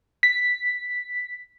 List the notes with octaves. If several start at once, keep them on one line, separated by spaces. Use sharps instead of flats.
B6